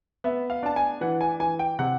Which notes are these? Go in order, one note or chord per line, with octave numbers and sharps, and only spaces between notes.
B3 E5
F5
D4 A5
G#5
E3 F#5
G#5
E3 G#5
G5
C3 F#5